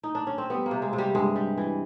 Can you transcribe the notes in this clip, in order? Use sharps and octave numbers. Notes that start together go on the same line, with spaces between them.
D#4
D4
C#4
C4
G3 B3
A#3
C3
G#3
C3
G3
G2 G#3
G3
E3